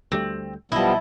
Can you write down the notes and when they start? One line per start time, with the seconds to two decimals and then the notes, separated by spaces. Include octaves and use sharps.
0.12 D2 G3 A3 C4
0.72 B1 F3 G3 B3 E4 D#5 A5